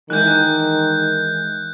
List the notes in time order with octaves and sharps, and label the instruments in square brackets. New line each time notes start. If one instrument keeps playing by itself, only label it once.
[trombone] D#3 [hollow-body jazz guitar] E3 G#3 E4 [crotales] F#6 G6